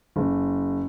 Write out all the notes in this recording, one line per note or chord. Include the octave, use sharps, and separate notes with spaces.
F#1